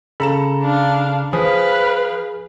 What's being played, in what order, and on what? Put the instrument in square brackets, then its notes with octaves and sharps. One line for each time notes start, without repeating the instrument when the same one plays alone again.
[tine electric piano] C#3 B5 [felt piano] A4 A#5 E7
[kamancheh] D4 F5
[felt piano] F3 [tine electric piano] G#4 [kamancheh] B4 F5